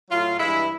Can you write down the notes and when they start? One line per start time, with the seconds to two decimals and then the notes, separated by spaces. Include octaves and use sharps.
0.11 A2 F#3 F4
0.39 G2 E3 G#3 E4